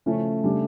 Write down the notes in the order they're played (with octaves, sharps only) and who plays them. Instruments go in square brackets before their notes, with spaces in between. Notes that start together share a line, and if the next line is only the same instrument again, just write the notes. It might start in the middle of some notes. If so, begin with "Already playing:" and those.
[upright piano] C#3 F3 C#4 E4 [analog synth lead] A3
[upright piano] C#3 G3 D4 G4